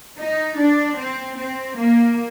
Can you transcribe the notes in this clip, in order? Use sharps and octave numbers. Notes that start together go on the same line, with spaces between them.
D#4
D4
C4
C4
A#3